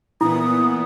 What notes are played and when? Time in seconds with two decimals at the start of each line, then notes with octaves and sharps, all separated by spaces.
0.21 A#2 E3 B3 E4 D#6